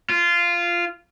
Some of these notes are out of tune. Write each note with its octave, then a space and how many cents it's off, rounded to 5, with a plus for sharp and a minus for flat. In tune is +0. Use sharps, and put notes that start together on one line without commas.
F4 -15